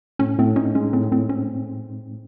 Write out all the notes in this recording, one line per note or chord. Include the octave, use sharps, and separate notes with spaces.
A2 C#4
A2 C4
C#4 D#4
G#3 C#4
A2 C4
A2 C4
C4 C#4